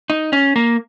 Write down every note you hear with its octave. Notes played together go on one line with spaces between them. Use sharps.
D#4
C#4
A#3